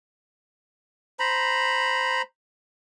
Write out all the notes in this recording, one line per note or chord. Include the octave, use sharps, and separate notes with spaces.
C5 A#5 B5